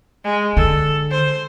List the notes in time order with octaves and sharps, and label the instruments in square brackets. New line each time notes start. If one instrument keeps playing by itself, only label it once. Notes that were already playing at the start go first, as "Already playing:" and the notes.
[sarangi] G#3
[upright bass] D3 [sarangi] A4
[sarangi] C5